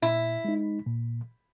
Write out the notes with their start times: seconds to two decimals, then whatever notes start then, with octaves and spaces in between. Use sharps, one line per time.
0.02 A#2 E4
0.44 G#3 D#4
0.87 A#2